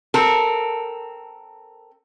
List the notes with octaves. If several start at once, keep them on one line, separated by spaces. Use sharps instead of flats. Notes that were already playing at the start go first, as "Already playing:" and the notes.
C4 A4 A#4